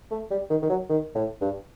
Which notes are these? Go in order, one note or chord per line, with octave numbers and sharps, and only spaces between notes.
A3
G3
D#3
D#3
F#3
D#3
A2
G2